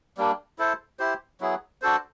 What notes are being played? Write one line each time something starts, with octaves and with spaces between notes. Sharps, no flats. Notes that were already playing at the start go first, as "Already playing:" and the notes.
G3 A#3 D4
E4 A4 C5
E4 G4 C5
F#3 B3 E4 G#4
D4 F#4 A4 C5